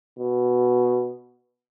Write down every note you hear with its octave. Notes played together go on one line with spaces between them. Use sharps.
B2